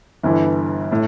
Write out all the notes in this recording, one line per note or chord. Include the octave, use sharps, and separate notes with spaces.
G1 G2 E3
A2